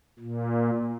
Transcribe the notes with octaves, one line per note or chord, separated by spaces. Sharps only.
A#2